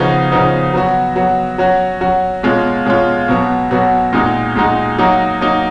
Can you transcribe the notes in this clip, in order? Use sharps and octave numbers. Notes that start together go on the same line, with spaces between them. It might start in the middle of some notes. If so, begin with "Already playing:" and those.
Already playing: C#3 F3 B3 D#4 F#4
C#3 F3 B3 D#4 F#4
F#3 B3 F#4
F#3 B3 F#4
F#3 C#4 F#4
F#3 C#4 F#4
B2 G#3 C#4 F4
B2 G#3 C#4 F4
B2 F#3 B3 F#4
B2 F#3 B3 F#4
A#2 G#3 D#4 F#4
A#2 G#3 D#4 F#4
F#3 A#3 D#4 F#4
F#3 A#3 D#4 F#4